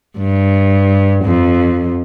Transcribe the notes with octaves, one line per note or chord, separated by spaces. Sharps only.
G2
F2